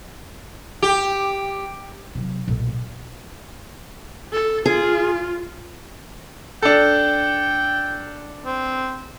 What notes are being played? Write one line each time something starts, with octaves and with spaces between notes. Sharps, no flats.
G4
C3 F#3
B1 A#2
A4
F4 G#4
D4 A4 G5
C4